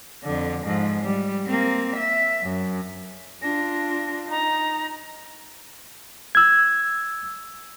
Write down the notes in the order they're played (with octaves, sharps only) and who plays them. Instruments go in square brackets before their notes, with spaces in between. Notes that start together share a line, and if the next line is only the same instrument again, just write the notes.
[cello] F2 D3
G#2 F3
G3
A#3 C4
E5
F#2
[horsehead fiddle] D4 F4 [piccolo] A#6
[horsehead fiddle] D#4 [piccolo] A#5
[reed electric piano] E6 G#6